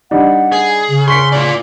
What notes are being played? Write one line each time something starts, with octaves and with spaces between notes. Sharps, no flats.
G3 D4 D#4 F#5
G#4
C#3
C6 C#6 B6 C#7
F4 D5